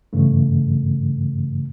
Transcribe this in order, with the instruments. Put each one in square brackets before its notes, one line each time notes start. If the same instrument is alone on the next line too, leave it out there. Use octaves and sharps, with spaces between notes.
[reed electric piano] G2 C#3 E3 A3